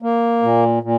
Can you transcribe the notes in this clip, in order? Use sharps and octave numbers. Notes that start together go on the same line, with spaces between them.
A#3
A#2
A#2